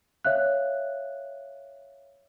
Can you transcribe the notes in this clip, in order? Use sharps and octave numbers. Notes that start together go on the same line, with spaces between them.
C#5 E5 F5 F#6